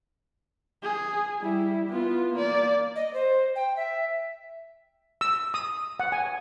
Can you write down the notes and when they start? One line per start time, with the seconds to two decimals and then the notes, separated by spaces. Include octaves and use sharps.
0.83 G#4
1.41 G3 E4
1.88 B3 F4
2.33 A#3 D5
2.96 D#5
3.14 C5
3.56 G5
3.76 E5
5.21 E6
5.54 D#6
6.00 F#5
6.12 G#5